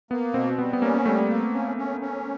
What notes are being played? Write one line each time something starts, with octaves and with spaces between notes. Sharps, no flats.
A#3 B3
B2 C4
G3 B3
B3
A#3 C#4
G3 A3
A#3
C#4
C#4
C#4